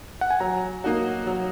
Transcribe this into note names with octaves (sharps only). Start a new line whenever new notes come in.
F#5
G#5
F#3 A#5
A#3 D#4 F#4
F#3